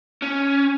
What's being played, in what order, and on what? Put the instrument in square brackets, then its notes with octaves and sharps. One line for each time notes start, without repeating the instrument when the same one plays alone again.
[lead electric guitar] C#4